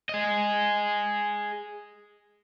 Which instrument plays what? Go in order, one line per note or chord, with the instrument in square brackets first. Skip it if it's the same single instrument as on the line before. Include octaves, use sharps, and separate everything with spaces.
[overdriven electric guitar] G#4 D#5